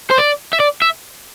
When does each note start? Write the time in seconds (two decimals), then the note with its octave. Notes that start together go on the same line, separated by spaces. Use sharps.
0.11 C5
0.19 D5
0.53 E5
0.60 D5
0.82 E5